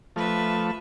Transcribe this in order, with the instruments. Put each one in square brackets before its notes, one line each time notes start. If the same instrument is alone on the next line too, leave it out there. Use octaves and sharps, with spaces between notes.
[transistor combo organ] F3 A3 [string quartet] B4 E5